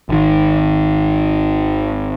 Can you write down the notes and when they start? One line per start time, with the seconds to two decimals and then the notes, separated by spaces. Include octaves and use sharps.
0.09 G#1 D#3